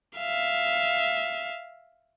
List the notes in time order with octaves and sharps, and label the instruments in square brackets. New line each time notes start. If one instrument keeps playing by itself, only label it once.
[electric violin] E5 F5